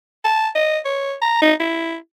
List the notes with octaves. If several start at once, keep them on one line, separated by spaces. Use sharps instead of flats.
A5
D#5
C#5
A#5
D#4
E4